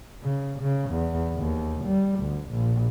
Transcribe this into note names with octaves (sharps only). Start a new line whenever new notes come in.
C#3
C#3
E2
D#2
G3
D2
A#1